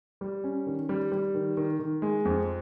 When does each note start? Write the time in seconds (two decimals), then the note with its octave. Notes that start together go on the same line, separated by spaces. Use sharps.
0.21 G3
0.44 C#4
0.67 D#3
0.89 G3
1.12 G3
1.35 D#3
1.57 D#3
1.79 D#3
2.02 G#3
2.25 F2